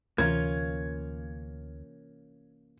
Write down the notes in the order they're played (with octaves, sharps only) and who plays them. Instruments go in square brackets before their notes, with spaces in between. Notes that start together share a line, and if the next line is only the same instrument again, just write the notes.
[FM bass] D2 [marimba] C3 E3 [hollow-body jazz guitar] A#3 C#4 F4 [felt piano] G#6